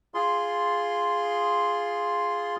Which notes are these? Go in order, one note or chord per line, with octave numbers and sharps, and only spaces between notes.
F4 G#4 C6